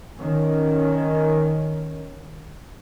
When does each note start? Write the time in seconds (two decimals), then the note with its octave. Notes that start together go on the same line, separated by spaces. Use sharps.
0.18 D#3 C#4